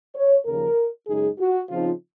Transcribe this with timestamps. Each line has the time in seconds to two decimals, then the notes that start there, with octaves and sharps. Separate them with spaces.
0.15 C#5
0.46 D#2 C#3 F3 A#4
1.07 F#2 C#3 G#3 D#4 G#4
1.39 F#4
1.69 C#3 F3 C4 D#4 F4